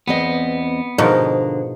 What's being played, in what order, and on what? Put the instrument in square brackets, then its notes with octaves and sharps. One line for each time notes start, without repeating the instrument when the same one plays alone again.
[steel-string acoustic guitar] E2 C4 D#5 [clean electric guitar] B3
[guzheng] G#2 B2 F3 [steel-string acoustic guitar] D3 [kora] D#4 A#4